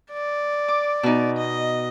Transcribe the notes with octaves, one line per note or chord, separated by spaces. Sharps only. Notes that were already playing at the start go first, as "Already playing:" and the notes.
D5
D6
B2 D#4
D#5